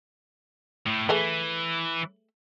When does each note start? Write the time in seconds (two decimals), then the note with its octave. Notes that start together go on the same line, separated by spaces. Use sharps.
0.86 A2
1.09 E3 A3 G#4 B4